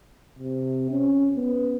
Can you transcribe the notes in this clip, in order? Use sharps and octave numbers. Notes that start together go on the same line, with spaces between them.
C3
C#4
B3